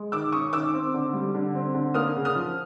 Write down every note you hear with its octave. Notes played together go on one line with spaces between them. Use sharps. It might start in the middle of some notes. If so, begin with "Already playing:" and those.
Already playing: G#3
D#3 D6 E6
C#4 C#6 D#6
D#3 D6 E6
C4
D3
G3
D3
C4
D3
A#3 D#6 F6
C#3
D#6 F6
F3